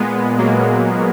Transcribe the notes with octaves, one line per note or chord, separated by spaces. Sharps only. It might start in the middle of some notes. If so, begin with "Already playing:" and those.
Already playing: A#2 G#3 B3
F#3 A#3